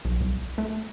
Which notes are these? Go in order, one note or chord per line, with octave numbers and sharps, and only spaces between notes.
B1
C2
A3